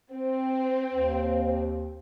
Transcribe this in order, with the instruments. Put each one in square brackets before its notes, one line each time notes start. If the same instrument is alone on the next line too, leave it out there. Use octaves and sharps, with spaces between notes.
[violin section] C4
[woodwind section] D#2